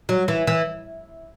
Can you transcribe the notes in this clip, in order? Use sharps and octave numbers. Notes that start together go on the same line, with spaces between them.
F#3
E3
E3